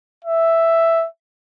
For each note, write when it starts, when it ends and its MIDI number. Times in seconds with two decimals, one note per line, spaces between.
0.24 1.06 76